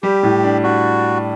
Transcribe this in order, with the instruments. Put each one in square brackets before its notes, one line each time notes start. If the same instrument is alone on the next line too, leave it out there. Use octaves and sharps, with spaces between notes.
[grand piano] G3 [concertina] G4
[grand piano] A2
D4
[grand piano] D4 [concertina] F#4